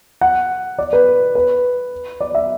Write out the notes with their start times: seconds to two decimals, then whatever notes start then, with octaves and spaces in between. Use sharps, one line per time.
0.21 F#5
0.79 D5
0.93 B4
1.35 B4
2.21 D5
2.35 E5